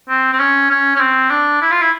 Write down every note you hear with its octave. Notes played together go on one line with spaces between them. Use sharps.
C4
C4
C#4
C#4
C#4
C4
D4
E4
F4
E4